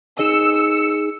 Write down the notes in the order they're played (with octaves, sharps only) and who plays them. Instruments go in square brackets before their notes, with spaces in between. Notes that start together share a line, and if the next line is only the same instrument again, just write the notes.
[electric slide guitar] D#4 G#4 D#5 [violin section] E6 C#7